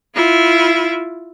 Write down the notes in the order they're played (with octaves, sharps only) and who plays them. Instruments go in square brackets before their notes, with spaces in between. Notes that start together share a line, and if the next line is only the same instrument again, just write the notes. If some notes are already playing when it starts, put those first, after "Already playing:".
[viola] E4 F4